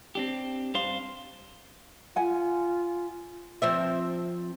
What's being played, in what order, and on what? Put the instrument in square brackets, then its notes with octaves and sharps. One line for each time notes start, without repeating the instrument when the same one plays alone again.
[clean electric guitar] C4 D4 G4
G2 D4 C5 F5 C6
[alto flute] F4 [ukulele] F#5 G#5
[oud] F3 C4 E5